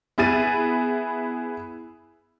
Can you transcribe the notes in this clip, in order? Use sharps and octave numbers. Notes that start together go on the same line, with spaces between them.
B3 E4 G#4 A6 D#7